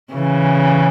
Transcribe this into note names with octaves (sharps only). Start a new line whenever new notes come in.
C#3 E3